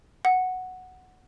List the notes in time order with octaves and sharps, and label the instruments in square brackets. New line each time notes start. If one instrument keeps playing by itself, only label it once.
[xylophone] F#5